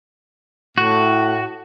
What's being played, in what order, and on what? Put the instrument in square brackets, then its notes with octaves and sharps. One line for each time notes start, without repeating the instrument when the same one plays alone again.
[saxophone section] A2 [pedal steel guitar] F#4